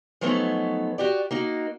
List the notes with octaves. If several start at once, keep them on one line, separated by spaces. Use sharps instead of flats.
F3 F#3 A3 B3 C#4 D#4
F#4 G4 D5
A#3 D#4 F#4